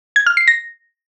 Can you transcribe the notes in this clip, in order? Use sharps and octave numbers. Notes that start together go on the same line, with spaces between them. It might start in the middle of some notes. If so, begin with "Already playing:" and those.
G#6
F6
C7
A#6